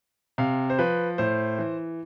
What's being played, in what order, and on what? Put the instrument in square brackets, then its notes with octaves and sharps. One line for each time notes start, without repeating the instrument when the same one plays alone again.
[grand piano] C3 F5
C5
F3 B4
A2 C5
E3